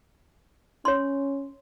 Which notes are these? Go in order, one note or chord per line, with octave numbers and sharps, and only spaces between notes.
C#4 C#5 C6